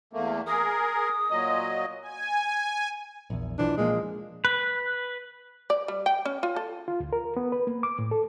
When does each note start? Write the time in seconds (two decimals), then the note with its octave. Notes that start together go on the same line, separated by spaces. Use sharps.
0.13 E2 A3 A#3
0.47 G#4 A#4 D#6
1.31 A#2 F#3 D#5
2.02 G#5
3.30 A#1 E2
3.58 B1 E3 F3 D4
3.77 A#2 F3 G#3 A#3
4.45 B4
5.70 D5
5.88 G3
6.06 G5
6.26 C#4
6.43 F4
6.56 A4
6.88 F4
7.00 D2
7.13 A#4
7.37 B3
7.52 B4
7.67 A#3
7.83 D6
7.99 A2
8.11 A4